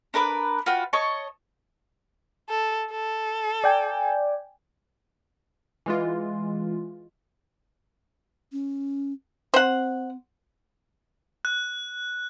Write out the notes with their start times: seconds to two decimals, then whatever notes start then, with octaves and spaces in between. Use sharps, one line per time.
0.14 D4 A#4 B4 D6
0.66 F4 F#4 B4 G5
0.93 C#5 D#5 A5 C#6
2.49 A4
2.91 A4
3.64 D5 G5 G#5
5.86 E3 G#3 F4
8.52 C#4
9.54 C4 C5 F#5
11.45 F#6